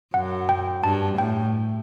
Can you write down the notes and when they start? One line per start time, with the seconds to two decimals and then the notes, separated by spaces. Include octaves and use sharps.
0.14 F#2 F#5
0.49 G5
0.84 G2 A5
1.18 A2 G5